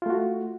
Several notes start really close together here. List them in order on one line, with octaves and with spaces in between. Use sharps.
F4 A3 F#4